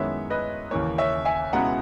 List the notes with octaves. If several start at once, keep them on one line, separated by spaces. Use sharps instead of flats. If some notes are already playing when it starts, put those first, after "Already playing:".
Already playing: F#2 D#3 G#3 B3 E4 C#5 E5
B4 D#5
D#2 C#3 E3 A#3 C#5
C#5 E5
E5 G#5
C#2 B2 G#3 B3 E4 F#5 A#5